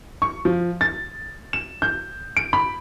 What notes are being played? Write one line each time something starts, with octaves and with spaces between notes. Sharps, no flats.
C#6
F3
A6
E7
G6
D7
B5